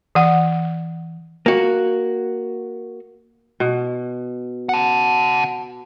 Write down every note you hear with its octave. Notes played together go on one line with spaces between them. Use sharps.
E3 F#5
A#3 F#4
B2
F#5 A5